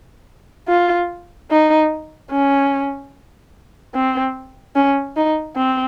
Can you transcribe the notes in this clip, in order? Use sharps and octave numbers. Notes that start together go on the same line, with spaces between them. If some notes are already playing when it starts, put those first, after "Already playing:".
F4
D#4
C#4
C4
C#4
D#4
C4